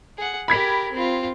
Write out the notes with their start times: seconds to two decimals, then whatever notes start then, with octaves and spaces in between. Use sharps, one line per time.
0.17 G#4 F#5
0.48 G4 A#4 B5 G#6 B6
0.93 C4 F4